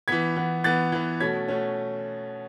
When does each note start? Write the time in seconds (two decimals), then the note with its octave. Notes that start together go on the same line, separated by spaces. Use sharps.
0.08 E3 B3 G#6 B6
0.36 E3 B3
0.64 E3 B3 F#6 A6
0.92 E3 B3
1.20 B2 A3 C#4 G#6 B6
1.48 B2 A3 C#4